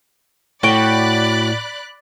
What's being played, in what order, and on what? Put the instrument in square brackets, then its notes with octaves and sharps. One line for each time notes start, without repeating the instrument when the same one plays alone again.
[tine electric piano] A2 [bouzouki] F#4 G5 [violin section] D5 B5 F#6